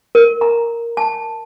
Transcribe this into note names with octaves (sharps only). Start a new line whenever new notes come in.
A#4
A#5
A5